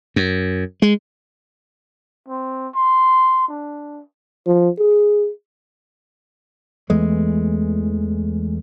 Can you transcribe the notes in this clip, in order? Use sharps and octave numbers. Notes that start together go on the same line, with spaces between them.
F#2
G#3
C4
C6
D4
F3
G#4
E2 E3 G#3 A3